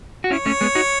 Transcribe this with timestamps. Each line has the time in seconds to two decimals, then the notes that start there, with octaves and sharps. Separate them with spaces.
0.24 F#4
0.31 C#4 E4 C#5
0.46 A3 C#4
0.61 G#3 B3
0.75 D#4 F#4